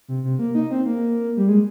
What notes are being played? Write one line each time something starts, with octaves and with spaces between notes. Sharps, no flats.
C3
C3
A#3
D#4
C4
A#3
G3
G#3